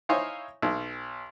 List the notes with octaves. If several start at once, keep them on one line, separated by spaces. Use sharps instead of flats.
D#4 E4 C5 C#5 F5 G#5
B1